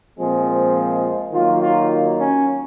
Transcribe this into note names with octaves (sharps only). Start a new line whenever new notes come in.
A#2 F3 G#3 C4
D#3 F#3 A#3 F4
F4
C#4